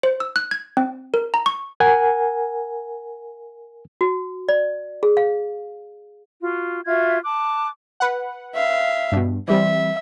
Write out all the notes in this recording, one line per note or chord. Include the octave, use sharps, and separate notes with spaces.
C5
E6
F#6
G#6
C4
A#4
A#5
C#6
A#4 F#5 G#5
F#4
D5
G#4
F5
F4 F#4
F4 F#4 E5 G#6
A5 D6 F#6
B4 F#5
E5 F5
G2 B2
E3 G3 C4 E5